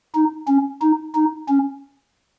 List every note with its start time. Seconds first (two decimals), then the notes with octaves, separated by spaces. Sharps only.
0.14 D#4
0.48 C#4
0.81 D#4
1.15 D#4
1.49 C#4